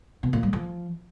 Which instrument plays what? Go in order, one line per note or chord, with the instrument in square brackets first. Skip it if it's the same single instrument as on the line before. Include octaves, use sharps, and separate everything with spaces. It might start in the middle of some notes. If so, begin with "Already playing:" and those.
[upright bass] B2
A#2
G3
F3